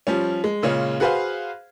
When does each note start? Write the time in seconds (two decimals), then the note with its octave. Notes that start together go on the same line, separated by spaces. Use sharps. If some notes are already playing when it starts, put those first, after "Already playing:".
0.07 F3 G3 C#4
0.44 G#3
0.62 A#2 C#3 G#3 C#4
1.00 F#4 G#4 B4 C5 F5